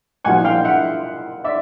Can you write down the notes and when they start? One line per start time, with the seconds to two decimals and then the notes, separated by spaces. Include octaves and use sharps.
0.24 C2 A#2 F3 F#5 G#5
0.45 F5 G5
0.64 E5 F#5
1.44 D5 E5